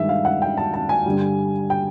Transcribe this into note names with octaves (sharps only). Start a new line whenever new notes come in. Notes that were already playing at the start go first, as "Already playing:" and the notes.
Already playing: G2 D#3 G#3 E5
F5
F#5
G5
A5
A5
G#5
G2 D3 G3
G5